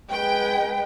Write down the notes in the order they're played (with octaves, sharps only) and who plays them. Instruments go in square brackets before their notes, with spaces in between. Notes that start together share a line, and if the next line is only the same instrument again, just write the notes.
[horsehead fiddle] G#3 B4 [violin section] G5